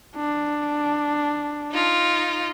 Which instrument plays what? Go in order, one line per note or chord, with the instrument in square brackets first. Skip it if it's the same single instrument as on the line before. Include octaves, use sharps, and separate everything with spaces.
[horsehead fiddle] D4
[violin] D#4 F4